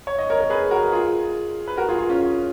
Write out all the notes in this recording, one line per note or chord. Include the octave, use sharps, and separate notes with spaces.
C#5
D#5
A#4 C#5
A#4
G#4 B4
F#4 A#4
F4 G#4
B4
F#4 A#4
F4 G#4
F4 G#4
C#4 F4